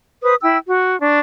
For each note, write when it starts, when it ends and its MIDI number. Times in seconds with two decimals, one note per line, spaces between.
0.22 0.34 71
0.22 0.34 72
0.22 0.34 87
0.42 0.57 64
0.42 0.57 79
0.42 0.57 88
0.68 0.99 66
1.00 1.19 62
1.00 1.19 85